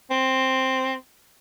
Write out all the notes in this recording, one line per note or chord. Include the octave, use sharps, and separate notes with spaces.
C4